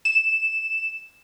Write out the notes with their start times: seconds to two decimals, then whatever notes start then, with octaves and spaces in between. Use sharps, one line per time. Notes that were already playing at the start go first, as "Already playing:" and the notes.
0.05 E7